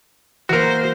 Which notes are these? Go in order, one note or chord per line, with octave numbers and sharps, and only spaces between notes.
E3 A#3 F#4 A#4 C5